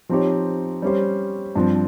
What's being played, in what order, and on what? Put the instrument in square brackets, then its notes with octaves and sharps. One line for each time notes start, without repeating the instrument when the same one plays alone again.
[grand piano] F3 C4 D#4 G4 C#5
G3 C#4 G4 C5
G2 F3 C4